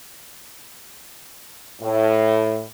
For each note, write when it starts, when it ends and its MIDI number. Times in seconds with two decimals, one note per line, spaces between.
1.80 2.62 45